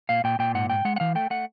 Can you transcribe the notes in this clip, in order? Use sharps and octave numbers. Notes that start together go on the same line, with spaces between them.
A#2 F5
A#2 G5
A#2 G5
G#2 F#5
G#2 G5
G#3 F#5
F#5
E3 F5
A3 G5
A3 F#5